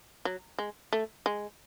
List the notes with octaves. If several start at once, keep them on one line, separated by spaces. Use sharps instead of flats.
F#3
G#3
A3
G#3